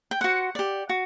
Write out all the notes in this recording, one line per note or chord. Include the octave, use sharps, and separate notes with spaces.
G5
F#4 C5 F#5
G4 D5
F#4